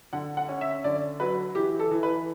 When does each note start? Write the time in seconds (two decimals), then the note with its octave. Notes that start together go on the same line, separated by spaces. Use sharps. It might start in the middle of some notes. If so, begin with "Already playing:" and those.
0.13 D3 F#5
0.37 F#5
0.49 C#4
0.61 E5
0.84 D3 D5
1.20 F#3 B4
1.55 E3 G4
1.80 A4
1.91 E3
2.03 B4